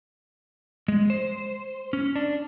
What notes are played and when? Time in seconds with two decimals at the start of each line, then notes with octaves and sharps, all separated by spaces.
0.88 G#3
1.10 C5
1.93 C#4
2.16 D4